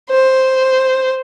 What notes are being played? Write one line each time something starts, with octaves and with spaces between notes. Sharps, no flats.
C5